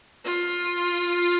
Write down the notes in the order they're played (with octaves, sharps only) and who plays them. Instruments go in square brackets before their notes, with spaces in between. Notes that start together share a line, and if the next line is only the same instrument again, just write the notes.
[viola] F4